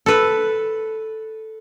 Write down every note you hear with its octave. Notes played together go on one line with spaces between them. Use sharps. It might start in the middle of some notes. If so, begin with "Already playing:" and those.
A4 B4